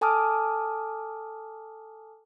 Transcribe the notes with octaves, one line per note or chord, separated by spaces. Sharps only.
A4 G#5 A5 D6 D#6 F6